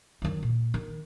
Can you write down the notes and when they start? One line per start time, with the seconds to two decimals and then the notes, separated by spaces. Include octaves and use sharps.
0.22 D#3 F#3
0.43 A#2
0.74 D#3